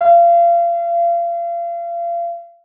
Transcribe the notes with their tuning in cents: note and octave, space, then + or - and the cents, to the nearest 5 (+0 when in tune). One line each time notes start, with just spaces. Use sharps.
F5 -35